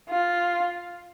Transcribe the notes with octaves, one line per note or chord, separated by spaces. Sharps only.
F4